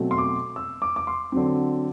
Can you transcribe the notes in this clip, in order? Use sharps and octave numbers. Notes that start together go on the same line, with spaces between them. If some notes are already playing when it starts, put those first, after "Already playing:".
Already playing: B2 F#3 A3 C4
C6
D6
E6
D6
D6
C6
D3 F#3 C4